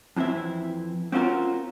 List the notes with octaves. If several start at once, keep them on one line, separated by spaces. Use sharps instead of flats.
F2 E3 C4 E4 E5
C4 C#4 F4 F#4 A#4